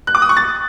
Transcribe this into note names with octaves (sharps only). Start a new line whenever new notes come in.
F#6
D6
D#6
C#6
A6